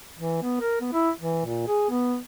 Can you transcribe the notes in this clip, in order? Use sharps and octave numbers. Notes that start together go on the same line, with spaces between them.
E3
B3
A#4
B3
E4
E3
A#2
G#4
B3